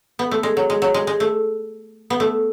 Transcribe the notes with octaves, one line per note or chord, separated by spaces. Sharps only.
B3
A3
G#3
F#3
G#3
F#3
G#3
G#3
A3
B3
A3